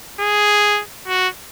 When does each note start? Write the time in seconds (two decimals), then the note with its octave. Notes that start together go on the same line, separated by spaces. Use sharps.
0.20 G#4
1.08 F#4